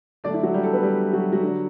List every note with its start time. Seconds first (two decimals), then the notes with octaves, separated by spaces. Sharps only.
0.24 D3 F#3 A3 D4 D5
0.34 E4
0.43 F#3 F#4
0.54 G3 G4
0.63 A3 A4
0.73 B3 B4
0.83 G3 G4
1.13 F#3 F#4
1.33 F#3 F#4
1.42 D3 G3